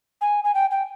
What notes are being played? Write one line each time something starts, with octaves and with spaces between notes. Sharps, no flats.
G#5
G#5
G5
G5